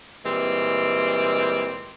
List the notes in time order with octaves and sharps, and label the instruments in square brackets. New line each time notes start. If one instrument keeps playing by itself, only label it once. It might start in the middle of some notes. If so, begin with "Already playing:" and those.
[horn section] A#2 E3 G3 G#3 C4